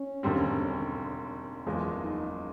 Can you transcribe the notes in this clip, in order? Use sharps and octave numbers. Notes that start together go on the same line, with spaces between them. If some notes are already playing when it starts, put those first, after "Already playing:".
Already playing: C#4
E1 D#2 D3 G3 C4
F#1 E2 C#3 F3 G#3
D#4